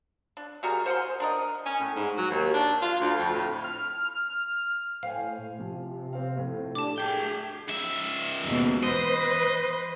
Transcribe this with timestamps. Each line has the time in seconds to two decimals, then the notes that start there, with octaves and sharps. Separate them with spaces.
0.37 D4
0.63 G3 F#4 G#4 A#4
0.86 C5 F#5 G#5 C6
1.20 D4 A#4 D#5
1.66 C#4
1.80 A2
1.96 G#2
2.18 F#3
2.30 D#2
2.54 D4
2.82 F4
3.01 D2
3.18 F2
3.34 A2
3.64 F6
5.03 A2 C5 F5 G5 G#5
5.59 C3 F3
6.13 C4 F5
6.37 A2 F3 A3
6.75 D4 G4 A4 A5 D6
6.98 A3 G#4 G5
7.68 C#2 E5
8.43 D#2 G#2 B2
8.83 E3 B4 C5 D#5